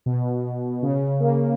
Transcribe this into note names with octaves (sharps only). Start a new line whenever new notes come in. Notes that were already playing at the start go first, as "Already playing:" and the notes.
B2
C#3
A#3